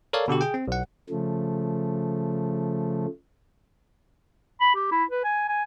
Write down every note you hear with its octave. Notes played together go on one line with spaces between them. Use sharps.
A4 A#4 C#5 D5 F5
B2 D3 F#4 G4
G#4 G5
C4
B1 F#5
C#3 F3 A3
B5
G4
E4
B4
G#5
G#5